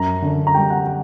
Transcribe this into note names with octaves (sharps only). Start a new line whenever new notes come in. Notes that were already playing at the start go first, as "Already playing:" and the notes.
Already playing: F#2 A#5
D3
A#5
G3 G5
F#5
F#5